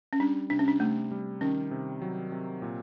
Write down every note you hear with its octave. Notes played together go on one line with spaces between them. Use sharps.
C#4
G3 D4
C3 D4
C#4
D4
C3 A3
G3
D#3 C#4
C3
F#3
C3
A#2